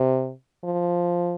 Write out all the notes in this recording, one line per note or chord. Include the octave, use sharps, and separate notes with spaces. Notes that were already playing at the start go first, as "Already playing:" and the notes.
Already playing: C3
F3